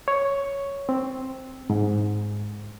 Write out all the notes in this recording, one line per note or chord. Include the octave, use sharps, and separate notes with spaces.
C#5
C4
G#2